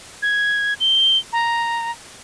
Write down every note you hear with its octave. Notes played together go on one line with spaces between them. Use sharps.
G#6
G7
A#5